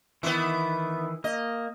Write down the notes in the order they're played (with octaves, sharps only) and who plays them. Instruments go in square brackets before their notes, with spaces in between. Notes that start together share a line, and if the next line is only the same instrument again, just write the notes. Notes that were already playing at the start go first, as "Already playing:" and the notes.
[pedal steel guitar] D#3 E3 [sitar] B3 E4
[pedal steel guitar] A#3 [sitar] D#5